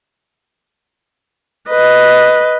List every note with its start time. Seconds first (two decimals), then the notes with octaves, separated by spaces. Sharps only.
1.69 B4 D#5